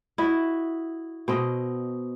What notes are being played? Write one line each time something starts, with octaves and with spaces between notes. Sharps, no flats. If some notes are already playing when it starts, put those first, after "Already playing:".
E4 F#4 D#5 E5
B2 C4 D#5